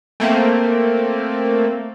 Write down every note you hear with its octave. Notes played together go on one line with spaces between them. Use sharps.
A3 A#3 C4